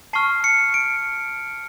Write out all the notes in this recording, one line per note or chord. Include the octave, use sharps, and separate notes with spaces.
A5 C#6 F6 C7
C#7
D7